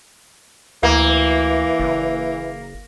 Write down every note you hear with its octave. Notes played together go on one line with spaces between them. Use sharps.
D2 E3 A#3
F#1